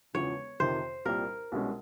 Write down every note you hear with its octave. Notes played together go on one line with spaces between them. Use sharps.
E1 E2 C#3 F3 C#5
F2 C3 D#3 C5
C2 A#2 G3 A#4
C2 B2 G#3 C#4